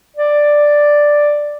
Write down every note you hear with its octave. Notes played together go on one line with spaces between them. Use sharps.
D5